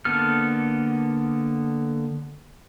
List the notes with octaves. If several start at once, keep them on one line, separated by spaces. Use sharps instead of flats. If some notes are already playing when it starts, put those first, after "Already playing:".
D3 A#3 B3 A4 F6